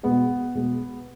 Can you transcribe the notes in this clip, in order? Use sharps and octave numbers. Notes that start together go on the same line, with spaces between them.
B2 G#3 B3
B2 G#3